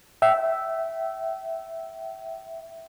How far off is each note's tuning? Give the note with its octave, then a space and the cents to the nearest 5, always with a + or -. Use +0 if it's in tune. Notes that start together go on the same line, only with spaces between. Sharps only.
E5 +0 G5 -35